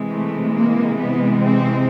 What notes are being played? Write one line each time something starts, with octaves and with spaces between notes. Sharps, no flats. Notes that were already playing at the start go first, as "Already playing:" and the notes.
Already playing: C3 E3 G#3
A3
A#3
B3
C4